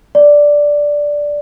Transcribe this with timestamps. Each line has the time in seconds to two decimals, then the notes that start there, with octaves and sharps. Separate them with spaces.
0.15 D5